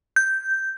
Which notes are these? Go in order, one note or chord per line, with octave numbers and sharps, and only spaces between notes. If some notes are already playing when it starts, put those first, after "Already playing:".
G6